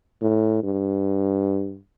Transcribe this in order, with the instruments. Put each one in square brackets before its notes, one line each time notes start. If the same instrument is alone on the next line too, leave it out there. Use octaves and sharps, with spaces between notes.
[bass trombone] A2
G2